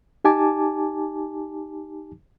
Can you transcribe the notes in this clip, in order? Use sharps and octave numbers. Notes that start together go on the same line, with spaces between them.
D#4 G4 G#5 A5 D6